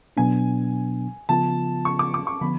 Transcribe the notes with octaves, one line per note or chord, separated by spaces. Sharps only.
B2 F#3 B3 D4 G#5
C#3 F3 B3 F4 A5
C#6
D6
D6
C#6
D3 F3 B3 B5